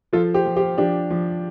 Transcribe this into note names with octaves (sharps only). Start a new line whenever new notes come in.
F3 F4 A4
G4 C5
F3
G4 C5
F3 D4 G4
F3